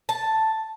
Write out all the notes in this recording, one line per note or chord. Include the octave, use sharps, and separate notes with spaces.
A5